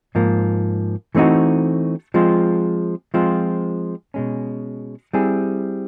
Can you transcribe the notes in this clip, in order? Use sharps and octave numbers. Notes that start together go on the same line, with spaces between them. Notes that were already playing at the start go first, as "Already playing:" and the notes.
G#2 F3 A#3
E3 A3 C4 D#4 F#4
F3 G#3 C4 F4
F3 G#3 C4 F4
B2 G#3 C#4
G3 C4 E4 G#4